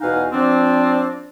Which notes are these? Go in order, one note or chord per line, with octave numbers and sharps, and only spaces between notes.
E2 B2 D#4 F5 F#5 G#5
F3 C4 D4